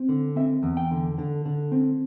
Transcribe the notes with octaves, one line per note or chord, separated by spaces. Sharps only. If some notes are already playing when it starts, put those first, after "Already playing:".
Already playing: C4
D3
C4 E5
E2
G5
D3
D3
D3
C4